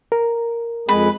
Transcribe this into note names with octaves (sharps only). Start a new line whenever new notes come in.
A#4
F2 G#3 G#4 B4